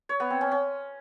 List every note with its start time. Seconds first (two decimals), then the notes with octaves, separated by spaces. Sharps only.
0.09 C#5
0.20 B3
0.30 C4
0.41 C#4
0.51 C#4